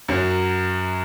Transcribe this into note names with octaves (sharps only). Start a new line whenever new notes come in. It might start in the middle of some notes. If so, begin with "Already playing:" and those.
F#2 F#3